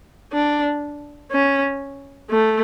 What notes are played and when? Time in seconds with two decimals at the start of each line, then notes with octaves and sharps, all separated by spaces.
0.32 D4
1.32 C#4
2.30 A3